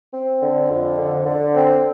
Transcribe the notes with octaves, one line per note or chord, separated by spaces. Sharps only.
C4
D3
F2
D3
D3
C4